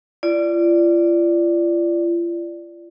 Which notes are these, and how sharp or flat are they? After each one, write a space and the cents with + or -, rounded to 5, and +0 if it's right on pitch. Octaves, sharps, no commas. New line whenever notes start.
F4 -40 D5 +0